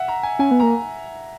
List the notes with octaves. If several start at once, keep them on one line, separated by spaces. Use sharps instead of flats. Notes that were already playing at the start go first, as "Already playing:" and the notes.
Already playing: E5 F#5
A#5
G#5
C#4 G#5
B3
A#3 A#5